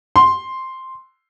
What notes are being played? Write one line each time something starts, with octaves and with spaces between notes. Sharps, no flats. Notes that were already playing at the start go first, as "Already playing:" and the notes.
C6